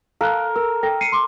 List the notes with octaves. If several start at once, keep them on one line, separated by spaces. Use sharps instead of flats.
A4 A#4 F5 F#6
A#4 E6
A4 G5 A#6
C7 C#7 D#7
C6 D6